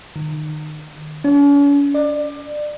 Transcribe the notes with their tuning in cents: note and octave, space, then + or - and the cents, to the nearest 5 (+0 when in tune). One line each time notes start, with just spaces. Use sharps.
D#3 -30
C#4 +45
D5 +25